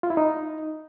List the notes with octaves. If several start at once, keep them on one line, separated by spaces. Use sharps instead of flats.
F4
E4
D#4